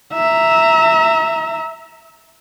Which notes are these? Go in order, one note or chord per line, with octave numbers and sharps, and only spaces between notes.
E5 A#5